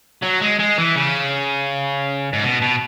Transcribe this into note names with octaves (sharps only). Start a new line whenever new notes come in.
F#3
G#3
G#3
E3
C#3
G#2
B2
B2